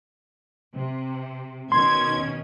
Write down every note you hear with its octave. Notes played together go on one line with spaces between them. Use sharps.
C3
B2 D#3 C#4 C6 G#6